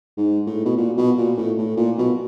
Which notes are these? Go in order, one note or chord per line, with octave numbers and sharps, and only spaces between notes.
G#2
A2
B2
A#2
B2
A#2
A2
A2
A#2
B2